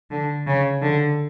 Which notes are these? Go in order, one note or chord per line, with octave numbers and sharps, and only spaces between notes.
D3
C#3
D3